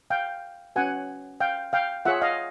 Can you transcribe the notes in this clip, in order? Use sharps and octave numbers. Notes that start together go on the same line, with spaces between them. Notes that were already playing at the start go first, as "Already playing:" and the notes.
F5 G5
C#4 F#4 B4 F#5 G#5
F5 G5
F5 G5
F4 G#4 C#5 E5 F#5
D#5 F5